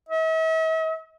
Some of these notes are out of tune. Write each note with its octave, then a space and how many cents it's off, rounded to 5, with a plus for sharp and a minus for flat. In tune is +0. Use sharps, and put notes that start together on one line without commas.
E5 -45